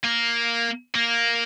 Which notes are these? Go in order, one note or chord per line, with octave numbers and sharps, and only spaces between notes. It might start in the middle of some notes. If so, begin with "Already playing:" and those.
A#3
A#3